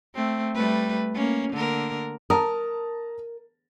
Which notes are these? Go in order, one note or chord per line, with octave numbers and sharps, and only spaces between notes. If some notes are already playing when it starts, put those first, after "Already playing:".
A3 C4
G3 A3 B4
A#3 C#4
D3 A#3 A#4
A#4 A5 A#5 D#6